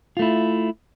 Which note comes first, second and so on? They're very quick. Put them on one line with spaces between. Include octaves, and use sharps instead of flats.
F4 A3 E4